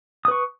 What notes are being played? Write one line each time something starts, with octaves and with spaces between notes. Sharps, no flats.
B4 C#6 D#6